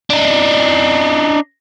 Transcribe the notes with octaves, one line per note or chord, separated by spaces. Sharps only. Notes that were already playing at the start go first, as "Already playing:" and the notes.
D4 D#4